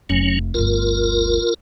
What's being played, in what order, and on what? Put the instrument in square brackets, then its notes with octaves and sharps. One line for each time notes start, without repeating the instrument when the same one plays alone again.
[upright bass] F1 [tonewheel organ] F#3 C#4
[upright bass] G1 D2 [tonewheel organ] F4 A#4